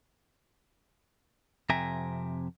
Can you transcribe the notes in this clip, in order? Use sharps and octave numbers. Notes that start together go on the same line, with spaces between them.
F2 C3 E5 G5 G#5 A#5